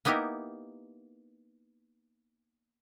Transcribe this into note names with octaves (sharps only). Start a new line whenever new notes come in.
A#3 B3 D#4 E4 G4 A#4